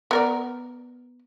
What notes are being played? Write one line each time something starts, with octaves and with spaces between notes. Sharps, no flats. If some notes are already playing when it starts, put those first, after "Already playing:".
B3 A#4 D5